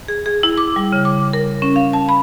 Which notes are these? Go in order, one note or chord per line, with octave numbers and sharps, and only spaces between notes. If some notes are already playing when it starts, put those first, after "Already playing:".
G#4
G#4
E4
D6
G3
C#3
D6
A#4
C#4
F5
A5
B5